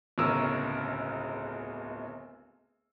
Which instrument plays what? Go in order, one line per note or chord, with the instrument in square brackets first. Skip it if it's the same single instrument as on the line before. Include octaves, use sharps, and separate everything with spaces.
[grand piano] D1 G1 C#2 C#4 A#4 E6